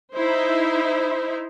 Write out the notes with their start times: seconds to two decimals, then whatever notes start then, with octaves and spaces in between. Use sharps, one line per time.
0.14 D#4 E4 C5